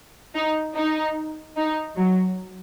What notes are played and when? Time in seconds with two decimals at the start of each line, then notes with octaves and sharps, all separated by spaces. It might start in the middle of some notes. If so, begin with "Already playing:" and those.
0.34 D#4
0.75 D#4
1.57 D#4
1.96 F#3